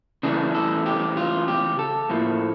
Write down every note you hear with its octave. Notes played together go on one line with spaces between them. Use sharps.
C#3 E3 A3 D4
A4
G4
F4
G4
A4
A2 F3 A3 A#3